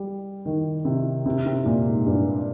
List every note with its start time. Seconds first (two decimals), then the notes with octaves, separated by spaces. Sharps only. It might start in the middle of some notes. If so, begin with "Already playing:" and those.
Already playing: G3
0.45 D#3
0.85 C3
1.26 C3
1.46 C3
1.66 A#2
1.86 G#2
2.06 G2